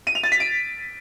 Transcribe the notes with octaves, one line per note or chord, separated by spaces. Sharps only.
D#7
F7
A6
B6
D7